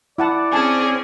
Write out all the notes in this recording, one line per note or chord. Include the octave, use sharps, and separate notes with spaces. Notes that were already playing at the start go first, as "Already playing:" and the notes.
E4 D5 F#5 A5
C4 C#4 G#4 G#5 A5